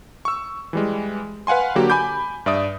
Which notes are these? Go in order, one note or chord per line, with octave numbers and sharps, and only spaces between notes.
C#6 E6
E3 G3 G#3
B4 F5 F#5 G#5 C6
D3 F#3 A#3 F#4 G4
G#5 B5 D6 G6
G2 D5 E5 D#6 D7